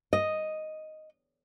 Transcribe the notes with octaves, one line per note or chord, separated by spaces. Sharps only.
D#5